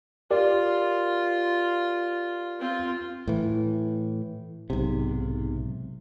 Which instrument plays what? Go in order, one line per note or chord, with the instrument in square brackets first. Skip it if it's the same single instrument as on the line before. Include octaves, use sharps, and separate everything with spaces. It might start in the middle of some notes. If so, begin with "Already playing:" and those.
[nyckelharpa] F4 [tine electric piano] G4 A#4 D5
[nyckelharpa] C4 F4
[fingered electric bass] A2 E3
B1 G#2 C3